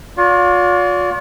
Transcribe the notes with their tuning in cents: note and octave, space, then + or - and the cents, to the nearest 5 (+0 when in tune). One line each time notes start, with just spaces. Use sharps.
F4 +40 D5 -40